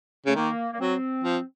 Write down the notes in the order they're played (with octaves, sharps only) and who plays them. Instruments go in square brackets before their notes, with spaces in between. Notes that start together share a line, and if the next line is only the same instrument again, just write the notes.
[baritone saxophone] C#3 [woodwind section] A3
[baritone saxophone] D#3 [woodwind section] A#3
[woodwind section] A#3
[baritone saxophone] F#3 [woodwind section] C4
[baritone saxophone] F3